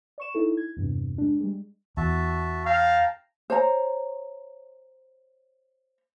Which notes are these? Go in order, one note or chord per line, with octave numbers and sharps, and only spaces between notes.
D5 C#6 E7
D#4 E4 A4
G#6
E2 G2 C3
G#3 D4
G3 G#3
E2 F#4 E5 A5
F5 G5 A5 A#5
C5 C#5 A#5